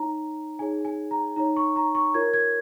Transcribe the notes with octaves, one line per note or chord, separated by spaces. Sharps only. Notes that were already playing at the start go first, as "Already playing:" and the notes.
Already playing: D#4 C#5 A#5
D#4 G#4 C#5 G#5
G#5
A#5
D#4 C#5 A#5
C#6
A#5
C#6
F4 A#4 C#5 G#6
G#6